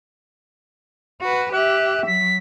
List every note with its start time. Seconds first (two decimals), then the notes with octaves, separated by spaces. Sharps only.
1.21 F#4 B4
1.53 G4 E5 F#6
2.07 F#3 B6